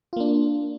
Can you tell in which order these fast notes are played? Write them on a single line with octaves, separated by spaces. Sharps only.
F4 A#3 D4